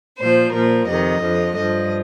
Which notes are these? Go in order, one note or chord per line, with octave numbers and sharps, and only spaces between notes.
A#2 F3 C5
A#2 F3 A#4
F2 C3 D#3 D#5
F2 D3 F3
G2 F3 D#5